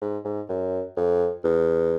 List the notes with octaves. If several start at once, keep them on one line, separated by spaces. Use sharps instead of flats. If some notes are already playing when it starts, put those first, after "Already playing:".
G#2
G#2
F#2
F2
E2